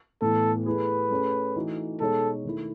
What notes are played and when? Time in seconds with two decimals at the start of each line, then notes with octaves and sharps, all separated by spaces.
0.22 A2 E3 B3 A4
0.66 A3 E4 G#4 B4
1.11 A3 C#4 G#4 C#5
1.56 E3 A3 D#4 F#4
2.01 B2 G#3 D#4 G#4 A4 C#5
2.45 D#3 A3 E4